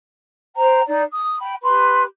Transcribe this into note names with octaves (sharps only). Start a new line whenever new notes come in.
C5 G5 A#5
D#4 D5
D#6
G5 B5
G4 B4 B5 C6